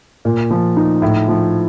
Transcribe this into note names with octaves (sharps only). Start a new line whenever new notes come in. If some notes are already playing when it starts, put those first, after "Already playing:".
A#2
F3
D#4
A2
F3